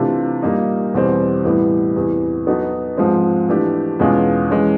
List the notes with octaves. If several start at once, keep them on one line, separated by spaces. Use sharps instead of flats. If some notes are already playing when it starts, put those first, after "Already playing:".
Already playing: C3 E3 A3 D4 F4
A#2 G3 A#3 D#4
E2 B2 G3 C4
A2 E3 G3 B3 E4
E2 C3 E3
F#3 B3 D#4 F#4 A4
G#2 F3 G#3 C4
E3 A3 D4 G4
E2 B2 G#3 C#4 F4
E3 G#3 C#4